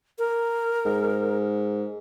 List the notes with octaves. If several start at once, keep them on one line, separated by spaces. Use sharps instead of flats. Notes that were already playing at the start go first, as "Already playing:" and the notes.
A#4
G#2